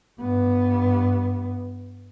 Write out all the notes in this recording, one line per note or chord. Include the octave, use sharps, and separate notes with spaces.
G2 B3